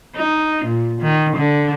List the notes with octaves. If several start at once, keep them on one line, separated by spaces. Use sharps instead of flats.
D#4
A#2
D#3
D3